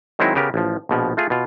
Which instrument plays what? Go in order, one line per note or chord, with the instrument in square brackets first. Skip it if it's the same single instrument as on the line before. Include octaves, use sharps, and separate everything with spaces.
[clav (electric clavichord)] D#3 F#3 G#3 C4 D#4 E4
C#3 B3 G4 A#4
A1 F3
A#1 B2 F3
A3 F4 G#4
B2 F4